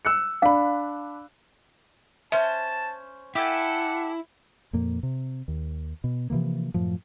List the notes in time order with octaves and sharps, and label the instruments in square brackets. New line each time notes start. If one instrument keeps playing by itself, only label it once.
[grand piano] E6 F#6 C#7
[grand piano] D4 B5 [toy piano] F5
[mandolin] C#4 C5 [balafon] E5 [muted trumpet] A5
[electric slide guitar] E4 [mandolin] G4 A4 G#5 [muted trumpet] F#5
[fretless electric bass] F2 A#2 A#3
C3
D#2
B2
C3 E3 F3 A#3
F#2 A2 F3